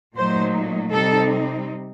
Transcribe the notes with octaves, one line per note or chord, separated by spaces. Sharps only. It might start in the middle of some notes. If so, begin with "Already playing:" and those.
A#2 F#3 A3 D#4 C5
C3 G3 C4 D#4 A4